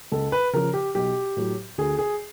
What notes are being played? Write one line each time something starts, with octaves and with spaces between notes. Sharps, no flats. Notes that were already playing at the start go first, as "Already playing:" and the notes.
C#2 A4
B4
C#3 F3 A#4
G4
B1 G4
A2 F#3
D2 G#4
G#4